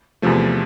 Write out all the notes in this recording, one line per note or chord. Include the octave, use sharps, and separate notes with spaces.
E2 C3 F3 A3